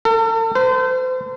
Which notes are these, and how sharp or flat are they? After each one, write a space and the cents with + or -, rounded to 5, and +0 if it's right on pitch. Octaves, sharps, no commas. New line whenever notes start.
A4 +40
C5 -35